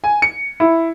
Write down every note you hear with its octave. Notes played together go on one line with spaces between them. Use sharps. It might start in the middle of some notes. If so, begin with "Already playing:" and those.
G#5
C#7
E4